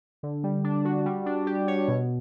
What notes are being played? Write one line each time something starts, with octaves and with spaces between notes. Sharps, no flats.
D3
G3
D4
F#4
G3
D4
G4
C#5
B2